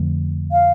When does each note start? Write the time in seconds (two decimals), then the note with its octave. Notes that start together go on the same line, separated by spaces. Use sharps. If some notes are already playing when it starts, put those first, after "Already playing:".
Already playing: F2 D3 F3 A3
0.52 F5